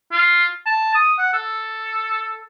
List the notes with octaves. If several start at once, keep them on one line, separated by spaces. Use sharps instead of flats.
F4
A5
D#6
F#5
A4